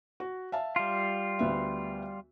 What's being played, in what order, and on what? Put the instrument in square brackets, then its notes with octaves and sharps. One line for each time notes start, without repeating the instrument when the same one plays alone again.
[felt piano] F#4
E5 F5 A5
[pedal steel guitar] G3 F4
[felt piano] D2 B3 E5